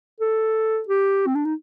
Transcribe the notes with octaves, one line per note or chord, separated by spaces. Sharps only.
A4
G4
C4
D4
D#4